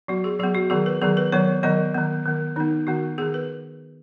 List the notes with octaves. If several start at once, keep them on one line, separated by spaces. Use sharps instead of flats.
F#3 B3 F#4
G#4
F#3 B3 G#4
F#4
D#3 F#3 B3 G#4
B4
D#3 F#3 B3 G#4
B4
D#3 F#3 B3 C#5
D#3 F#3 B3 D#5
D#3 B3
D#3 B3
D#3 B3 D#4
D#3 B3 F#4
D#3 B3 G#4
B4